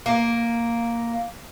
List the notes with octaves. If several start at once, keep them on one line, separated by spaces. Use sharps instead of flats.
A#3